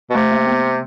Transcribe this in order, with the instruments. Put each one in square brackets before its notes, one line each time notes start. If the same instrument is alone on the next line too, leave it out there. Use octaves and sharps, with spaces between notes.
[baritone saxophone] B2
[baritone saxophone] C3 [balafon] A3
[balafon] A#3
B3